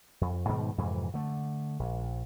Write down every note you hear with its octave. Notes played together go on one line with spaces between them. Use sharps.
F2
G#2 B2 D#3 G3
F2 G#2 C3 E3
D3 A3
A#1